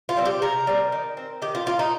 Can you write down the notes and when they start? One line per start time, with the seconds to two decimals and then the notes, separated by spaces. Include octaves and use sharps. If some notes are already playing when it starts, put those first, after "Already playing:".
0.09 F4
0.17 G3 C4
0.26 G4
0.42 C3 A#4
0.67 G3 C4
0.92 D#3
1.17 C4
1.42 D#3 G4
1.55 F4
1.66 A#3 F4
1.79 D#4